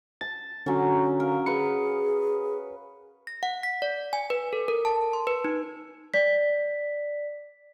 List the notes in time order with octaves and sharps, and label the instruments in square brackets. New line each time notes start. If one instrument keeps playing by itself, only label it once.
[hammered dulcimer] A5 [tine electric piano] A6
[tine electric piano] D3 F#4 [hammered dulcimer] F#3 C#4
[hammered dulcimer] A#4 [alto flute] F5
[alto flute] G#4 [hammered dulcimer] B4 F5 [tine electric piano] C#7
[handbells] A#6
F#5
B6
D5
G#5
B4
A4
A#4
A5
C6
B4
D#4
[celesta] D5 B6